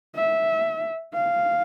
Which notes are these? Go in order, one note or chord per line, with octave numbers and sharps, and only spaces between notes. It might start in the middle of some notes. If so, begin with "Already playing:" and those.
E5
F5